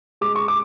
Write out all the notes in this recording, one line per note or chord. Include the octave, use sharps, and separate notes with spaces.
G#3 D6
C#6
D6